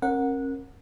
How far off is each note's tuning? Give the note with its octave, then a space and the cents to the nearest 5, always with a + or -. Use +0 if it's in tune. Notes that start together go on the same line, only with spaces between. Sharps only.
C#4 -40 A#4 +0 F#5 -15